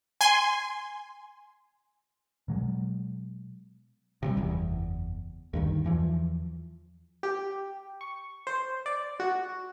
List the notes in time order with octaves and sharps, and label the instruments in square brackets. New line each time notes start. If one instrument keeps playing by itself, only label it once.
[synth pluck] G#5 C6
[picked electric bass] B2 F#3 G#3
[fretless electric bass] C3 F#3 G3
F#1 E2
D2 G2 D#3
E2 E3 F3
[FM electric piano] G4
C#6
C5
D5
F#4